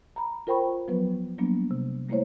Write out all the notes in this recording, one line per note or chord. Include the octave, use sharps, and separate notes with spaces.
A#5 B5
F4 A#4 C5 G5 B5 C#6
F3 F#3 B3 B4
F#3 G3 A#3 B3 D4
C3
G3 A3 A#3 E4 C5 C#5